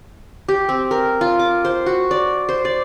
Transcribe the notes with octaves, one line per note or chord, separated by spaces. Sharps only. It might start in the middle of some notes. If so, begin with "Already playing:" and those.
G4
C4
A#4
F4
D6
C5
F#4
D5
C5
D5